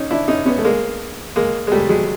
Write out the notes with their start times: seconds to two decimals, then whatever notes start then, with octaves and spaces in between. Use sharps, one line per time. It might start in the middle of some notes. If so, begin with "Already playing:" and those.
Already playing: C#4 D#4
0.10 D4 E4
0.28 C#4 D#4
0.46 B3 C#4
0.58 A3
0.64 G#3 A#3
1.36 G#3 A#3
1.67 G#3
1.72 G3 A3
1.89 F#3 G#3